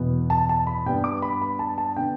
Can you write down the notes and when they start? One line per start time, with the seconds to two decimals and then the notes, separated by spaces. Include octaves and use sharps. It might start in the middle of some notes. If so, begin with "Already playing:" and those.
Already playing: E2 B2 B3
0.30 A5
0.49 A5
0.67 B5
0.86 G2 G3 B3 G5
1.04 D6
1.22 B5
1.42 B5
1.59 A5
1.78 A5
1.96 D3 B3 G5